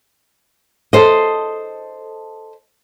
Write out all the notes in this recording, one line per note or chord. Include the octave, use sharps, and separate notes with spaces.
A4 C5 D#5